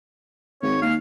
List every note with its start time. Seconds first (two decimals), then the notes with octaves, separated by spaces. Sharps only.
0.62 G#1 C#5
0.82 D#2 F5